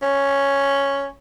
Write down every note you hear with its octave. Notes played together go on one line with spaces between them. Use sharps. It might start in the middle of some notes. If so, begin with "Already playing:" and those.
C#4